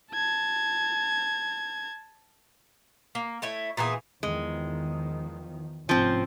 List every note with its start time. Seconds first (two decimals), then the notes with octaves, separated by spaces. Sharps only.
0.13 A5 G#6
3.15 A#3
3.42 A3 E4 C#5
3.77 A#2 E3 B3 G#4
4.23 E2 D#3 F3 G#3
5.89 F1 G#2 F3 C4 C#4